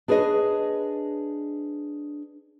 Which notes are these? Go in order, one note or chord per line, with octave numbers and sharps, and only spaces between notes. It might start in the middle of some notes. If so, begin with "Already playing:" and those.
D4 G#4 B4 C#5 D#5